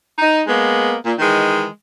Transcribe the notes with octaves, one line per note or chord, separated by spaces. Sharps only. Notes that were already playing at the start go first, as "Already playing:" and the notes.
D#4
G#3 A#3 B3
A#2
D#3 E3 G#3